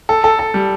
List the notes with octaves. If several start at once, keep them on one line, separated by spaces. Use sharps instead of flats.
A4
A4
A4
G3